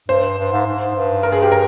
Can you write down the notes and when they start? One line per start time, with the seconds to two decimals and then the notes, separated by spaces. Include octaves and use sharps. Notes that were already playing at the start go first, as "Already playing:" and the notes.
0.08 G2 C5
0.38 G2
0.52 G#2
0.66 G#2
0.95 G2
1.23 A#4
1.32 G#4
1.42 G4
1.52 A#4